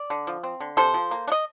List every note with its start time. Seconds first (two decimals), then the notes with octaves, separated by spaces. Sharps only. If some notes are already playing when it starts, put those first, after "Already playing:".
Already playing: D5
0.10 D3
0.27 F3
0.43 C4
0.60 D3
0.77 C3 A4 C5
0.94 F3
1.11 A#3
1.28 D4
1.32 D#5